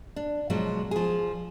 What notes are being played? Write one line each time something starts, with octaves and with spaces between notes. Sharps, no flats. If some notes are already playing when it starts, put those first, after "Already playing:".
D4
B2 F3 F#3 G#3
F3 G#4